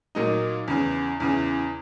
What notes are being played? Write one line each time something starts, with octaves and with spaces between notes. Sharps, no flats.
A#2 F#3 A#3 D#4
E2 C#3 E3
E2 C#3 E3